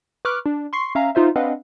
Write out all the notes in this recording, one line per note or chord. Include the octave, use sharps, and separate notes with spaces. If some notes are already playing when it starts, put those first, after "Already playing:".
B4 C#6 D6 F6 F#6
D4
C6 C#6 C7
C#4 E5 F5 G#5 A#5
D#4 F4 C5 E5
C4 D4 B4 D#5 F5 F#5